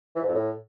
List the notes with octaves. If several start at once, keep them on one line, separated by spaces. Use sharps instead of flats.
E3
G#2
F2
A2